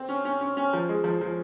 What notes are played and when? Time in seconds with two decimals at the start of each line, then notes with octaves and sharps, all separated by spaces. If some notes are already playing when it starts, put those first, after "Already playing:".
Already playing: C4
0.09 C#4
0.25 C#4
0.41 C#4
0.57 C#4
0.73 F3
0.89 G#3
1.04 F3
1.21 F3